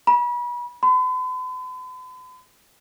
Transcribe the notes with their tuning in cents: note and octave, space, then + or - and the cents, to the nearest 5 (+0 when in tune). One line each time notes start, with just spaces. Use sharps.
B5 -35
B5 +45